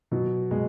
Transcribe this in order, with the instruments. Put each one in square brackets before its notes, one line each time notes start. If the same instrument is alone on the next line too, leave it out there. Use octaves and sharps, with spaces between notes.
[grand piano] B2 F#3
B2 G#3